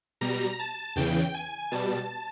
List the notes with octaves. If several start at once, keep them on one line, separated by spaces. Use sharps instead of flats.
B2 G3 A#5
A5
E2 C#3 E3 G5
G#5
B2 G3 A5